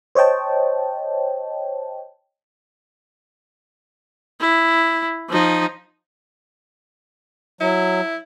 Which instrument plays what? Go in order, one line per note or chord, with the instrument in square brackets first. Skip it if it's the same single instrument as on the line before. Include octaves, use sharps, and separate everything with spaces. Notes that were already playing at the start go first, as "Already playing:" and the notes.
[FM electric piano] C5 C#5 D#5 G5 A5
[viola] E4
F3 D#4
[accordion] F#3 [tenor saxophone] E4